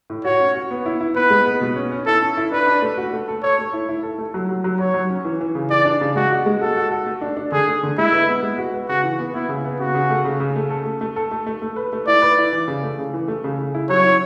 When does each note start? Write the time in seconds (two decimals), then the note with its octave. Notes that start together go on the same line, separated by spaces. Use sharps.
0.10 A2
0.25 F#4 C#5
0.40 C#4
0.55 F#4
0.71 B3
0.86 E4
1.00 E4
1.15 B3 B4
1.30 G#3
1.46 B3
1.61 B2
1.76 C#4
1.92 C#4
2.06 E4 A4
2.22 C#4
2.37 E4
2.52 D4 B4
2.67 D4
2.82 A3
2.97 F#4
3.13 A3
3.28 A4
3.43 A4 C#5
3.59 A3
3.73 E4
3.89 E4
4.03 A4
4.18 A3
4.34 F#3
4.49 F#3
4.64 F#3
4.79 F#3 C#5
4.94 F#3
5.10 C#4
5.25 E3
5.41 E3
5.55 C#3
5.70 E3 D5
5.85 D4
6.01 C#3
6.16 G#3 F#4
6.31 F#4
6.46 G#3
6.61 F#4 A4
6.76 F#4
6.91 F#4
7.07 A3
7.21 D4
7.37 D4
7.52 D3 G#4
7.67 A3
7.83 D3
7.98 G#3 E4
8.13 B4
8.29 B3
8.43 G#3
8.58 F#4
8.74 B4
8.89 C#3 F#4
9.04 E3
9.19 B3
9.34 B3 E4
9.49 C#3
9.64 B3
9.79 C#3 F#4
9.94 C#3
10.10 A3
10.25 C#3
10.40 C#3
10.56 A3
10.70 A4
10.86 A3
11.01 A3
11.16 A4
11.31 A3
11.46 A3
11.62 A3
11.76 B4
11.93 A3
12.07 E4 D5
12.22 B4
12.38 E4
12.52 E3
12.68 C#3
12.83 A3
12.98 C#3
13.13 E3
13.28 A3
13.44 C#3
13.58 C#3
13.74 E4
13.89 F#3 C#5
14.04 E4